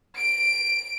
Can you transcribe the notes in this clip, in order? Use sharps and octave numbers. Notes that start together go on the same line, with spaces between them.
D7